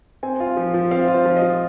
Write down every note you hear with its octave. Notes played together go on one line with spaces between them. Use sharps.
C4 G#5
F4
F3
F3
C4 F5
F4
C5
F3
D#5
F3